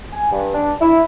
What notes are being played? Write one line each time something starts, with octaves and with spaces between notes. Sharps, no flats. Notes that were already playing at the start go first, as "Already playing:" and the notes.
G#5
G2
D4
E4